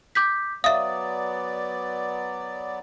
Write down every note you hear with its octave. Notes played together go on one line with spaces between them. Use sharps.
D6 G6 B6
F#3 B3 D5 E5 F5 D#6